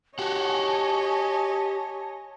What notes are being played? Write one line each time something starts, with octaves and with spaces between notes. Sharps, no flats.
F#4 G4 C#5 D#5 F#5 G#5 A5